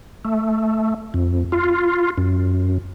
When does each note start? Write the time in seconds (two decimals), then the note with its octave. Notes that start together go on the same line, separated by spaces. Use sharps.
0.25 A3
1.14 F2
1.52 F4
2.18 F#2